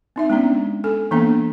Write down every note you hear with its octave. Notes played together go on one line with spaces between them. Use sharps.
C4 D#4 E5
G#3 B3 C#4 D4 D5
A4 G#5
E3 A#3 B3 D4 A4 F5